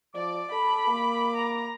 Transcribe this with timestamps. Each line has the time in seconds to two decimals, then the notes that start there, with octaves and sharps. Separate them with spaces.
0.15 F3 D5 D6
0.52 A4 B5
0.87 A#3
1.36 A#5